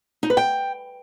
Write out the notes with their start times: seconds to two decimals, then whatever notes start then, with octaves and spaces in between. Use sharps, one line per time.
0.23 D#4
0.30 B4
0.37 G5